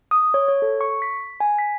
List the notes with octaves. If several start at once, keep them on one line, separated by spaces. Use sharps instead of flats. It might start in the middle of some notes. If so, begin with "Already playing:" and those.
D#6
C#5
C#5
A4
C#6
B6
G#5
B6